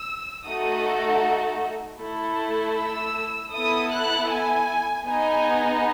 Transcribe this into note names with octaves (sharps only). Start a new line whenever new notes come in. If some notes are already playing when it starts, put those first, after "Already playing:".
Already playing: E6
A3 D#4 F#4 A4 D#6
A3 E4 A4
E6
B3 E4 A4 D#6
F#6
G#5
B3 D#4 G#4 G#5